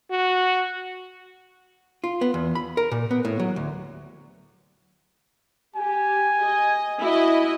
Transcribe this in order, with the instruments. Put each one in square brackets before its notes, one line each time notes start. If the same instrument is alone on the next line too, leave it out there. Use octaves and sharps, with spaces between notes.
[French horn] F#4
[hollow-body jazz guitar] F4
B3
E2
B5
A#4
A#2
B3
A2
F#3
D2
[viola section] G4 [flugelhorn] G#5
[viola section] D#5
E4 F#4 D#5